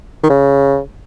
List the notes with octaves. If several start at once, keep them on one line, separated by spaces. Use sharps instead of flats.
D#3
C#3